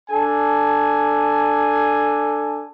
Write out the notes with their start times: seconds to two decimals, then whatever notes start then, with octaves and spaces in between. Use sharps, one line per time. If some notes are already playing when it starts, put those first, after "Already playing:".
0.10 D4 A4 G#5